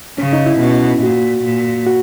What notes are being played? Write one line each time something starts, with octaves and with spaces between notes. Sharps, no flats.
C#3 C#4
D#4
E4
B2
A#2 F#4
A#2
F#4